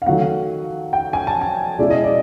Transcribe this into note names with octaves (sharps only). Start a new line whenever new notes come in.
F5
D#3 F#3 A3 F#5
G5
G#5
A5
G#5
B2 G#3 C#4 E4 D5
D#5
D5